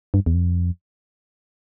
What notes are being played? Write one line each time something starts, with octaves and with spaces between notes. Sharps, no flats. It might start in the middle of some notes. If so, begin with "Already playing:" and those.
G2
E2
F2